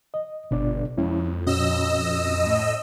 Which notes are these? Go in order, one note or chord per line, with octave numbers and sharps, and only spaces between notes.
D#5
G1 B2 D4 D5
F2 G#3 C#4 E4
A#2 C#4 F#4 D#5 E6
A2